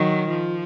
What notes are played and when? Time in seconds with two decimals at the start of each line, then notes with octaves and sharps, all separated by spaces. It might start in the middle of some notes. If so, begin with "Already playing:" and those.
Already playing: D#3 F#3
0.29 F3